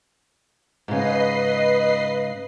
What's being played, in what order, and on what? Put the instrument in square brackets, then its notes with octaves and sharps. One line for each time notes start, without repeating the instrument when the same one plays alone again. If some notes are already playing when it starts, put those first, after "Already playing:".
[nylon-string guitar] G#2 C#3 [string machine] B4 D#5 C7